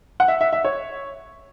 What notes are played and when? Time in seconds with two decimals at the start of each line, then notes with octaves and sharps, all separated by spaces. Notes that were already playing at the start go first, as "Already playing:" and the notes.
0.20 F#5
0.28 E5
0.41 E5
0.53 E5
0.64 C#5